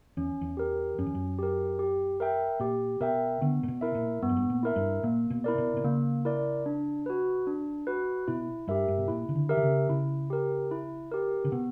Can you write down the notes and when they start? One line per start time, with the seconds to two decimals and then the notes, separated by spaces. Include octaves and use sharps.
0.17 E2 C#4
0.41 E2
0.57 G4 A#4
0.98 F#2 C#4
1.06 E2
1.15 F#2
1.38 G4 A#4
1.79 G4
2.20 A#4 E5 G5
2.60 A#2 G4
3.00 B2 A#4 E5 G5
3.41 D3 B3
3.63 A#2
3.68 B2
3.81 E4 A#4 E5
3.95 A#2
4.22 G2 B3
4.29 F#2
4.37 G2
4.50 A#2
4.63 E4 A#4 E5
4.76 G2
5.03 A#2 A#3
5.30 B2
5.44 E4 A#4 D5
5.58 B2
5.77 B2
5.84 C#3 A#3
6.25 E4 A#4 D5
6.66 D4
7.06 F#4 B4
7.47 D4
7.87 F#4 B4
8.28 B2 E4
8.68 G2 G4 A#4 E5
8.88 G2
8.98 B2
9.08 A#2 E4
9.29 C#3
9.35 D3
9.49 G4 A#4 E5
9.57 D3
9.63 C#3
9.89 C#3 E4
10.30 G4 A#4
10.71 E4
11.11 G4 A#4
11.45 C#3
11.52 B2 B3